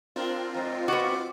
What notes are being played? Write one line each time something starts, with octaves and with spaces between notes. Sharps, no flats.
C4 D4 F4 A#4
F2 G#2 A#5
B3 F#4 D6